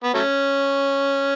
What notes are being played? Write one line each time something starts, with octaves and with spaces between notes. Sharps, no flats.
B3
F#3 A3 C#4